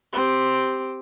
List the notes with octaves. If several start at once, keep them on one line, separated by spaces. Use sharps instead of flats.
C4 G4